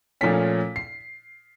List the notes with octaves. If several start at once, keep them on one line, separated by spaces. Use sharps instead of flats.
A#2 F3 A3 C#4 B6
C7